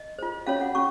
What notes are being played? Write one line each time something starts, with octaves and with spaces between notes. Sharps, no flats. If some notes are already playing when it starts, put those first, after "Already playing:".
Already playing: D#5
F4 C5
C#4 F#4 C#5 F5
F5
F#5
C#4 F#4 C#6